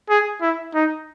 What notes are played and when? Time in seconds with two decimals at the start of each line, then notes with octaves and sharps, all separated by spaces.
0.09 G#4
0.42 E4
0.74 D#4